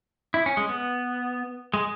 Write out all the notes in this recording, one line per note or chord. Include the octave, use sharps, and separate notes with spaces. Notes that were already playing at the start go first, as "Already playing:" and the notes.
E4
C#4
G#3
B3
G#3